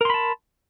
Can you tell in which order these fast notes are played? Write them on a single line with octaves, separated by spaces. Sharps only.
A#4 C6 B5 A5